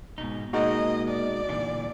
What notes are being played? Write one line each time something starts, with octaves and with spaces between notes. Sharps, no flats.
G#2 B2 D#4
B2 G#3 A#3 D#4 F#4 D#5
D5
A#2 D3 E3